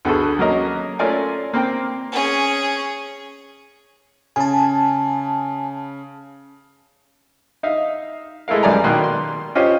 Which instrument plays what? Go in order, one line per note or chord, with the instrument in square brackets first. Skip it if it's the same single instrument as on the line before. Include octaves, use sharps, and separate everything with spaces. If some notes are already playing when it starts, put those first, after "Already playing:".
[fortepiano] D2 B3 G#4 A4 C#6
F#3 A#3 C#4 A#4 D#5
A3 C#4 F4 A#4 D5 G#5
A#3 C4 G5
[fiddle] C#4 G#4
[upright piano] C#3 [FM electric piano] G#5 A5
[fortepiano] D#4 E5 F5
G#3 A3 E4 A#4 F5
B1 F#2 G3 D5 G#5 A#5
B2 D#3 A#3 C6 F#6
C6
C#4 F4 G4 C5 D#5